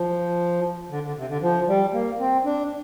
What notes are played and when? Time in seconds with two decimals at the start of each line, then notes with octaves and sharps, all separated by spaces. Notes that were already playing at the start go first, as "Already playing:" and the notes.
Already playing: F3
0.90 D3
1.03 D3
1.17 C3
1.29 D3
1.42 F3
1.68 G3
1.93 A#3
2.19 C4
2.45 D4